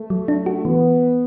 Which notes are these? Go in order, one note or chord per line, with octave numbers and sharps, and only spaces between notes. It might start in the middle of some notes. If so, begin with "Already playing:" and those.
Already playing: A3
F#3
D4
F#4
E3 B3